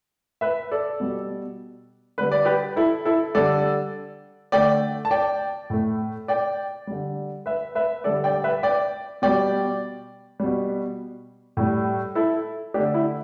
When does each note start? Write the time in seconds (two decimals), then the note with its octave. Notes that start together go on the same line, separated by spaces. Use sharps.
0.41 B4 E5
0.72 A4 D5
1.00 B2 G3
2.18 D3 G3 B4
2.32 D5
2.45 G4 B4
2.76 E4 A4
3.05 E4 A4
3.35 D3 G3 A4 D5
4.52 D3 A3 D5 G5
5.05 A5
5.11 D5 G5
5.70 A2 A3
6.28 D5 G5
6.87 D3 G3
7.46 B4 E5
7.75 B4 E5
8.04 D3 G3 A4 D5
8.24 D5 G5
8.44 B4 E5
8.63 D5 G5
9.22 B2 G3 D5 G5
10.40 B2 G3
11.57 A2 G3
12.15 E4 A4
12.74 A3 D4 G4
12.78 D3
12.94 E4